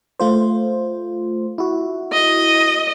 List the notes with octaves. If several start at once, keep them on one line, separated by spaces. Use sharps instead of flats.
A3 F4 C5
E4 F#4
D#5